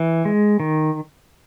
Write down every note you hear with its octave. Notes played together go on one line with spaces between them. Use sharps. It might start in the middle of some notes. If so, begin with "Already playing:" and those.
Already playing: E3
G#3
D#3